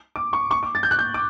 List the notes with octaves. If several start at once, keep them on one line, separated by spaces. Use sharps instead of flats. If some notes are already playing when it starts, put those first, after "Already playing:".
D6
C#6
C#6
D6
A6
G6
F#6
G6
D6